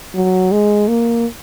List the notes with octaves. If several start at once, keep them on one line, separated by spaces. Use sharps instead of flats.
F#3
G#3
A#3